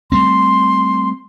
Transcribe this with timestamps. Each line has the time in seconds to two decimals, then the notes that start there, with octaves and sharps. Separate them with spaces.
0.12 G3 A3 C4 C6